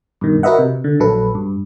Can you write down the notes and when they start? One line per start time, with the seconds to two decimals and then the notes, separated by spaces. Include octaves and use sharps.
0.21 G2 B2 D#3
0.43 F#4 A#4 B4 D#5 E5 F#5
0.59 C3
0.84 D3
1.00 A#1 F#3 A4 B4
1.35 G2